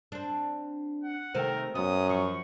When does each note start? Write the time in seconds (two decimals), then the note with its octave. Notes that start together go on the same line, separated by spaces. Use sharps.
0.12 C4 D4
1.03 F#5
1.35 C3 D#3 A3 A#4 C5 G5
1.75 F#2 B3 D#6
2.10 F3 C#6